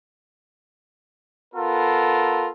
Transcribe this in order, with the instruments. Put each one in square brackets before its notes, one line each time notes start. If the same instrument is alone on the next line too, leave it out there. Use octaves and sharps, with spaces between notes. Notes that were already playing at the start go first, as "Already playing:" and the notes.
[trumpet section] B3 F4 A4 A#4